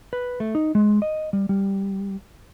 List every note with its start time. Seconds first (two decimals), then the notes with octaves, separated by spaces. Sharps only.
0.13 B4
0.40 A3
0.55 D#4
0.75 G#3
1.02 D#5
1.33 G3
1.49 G3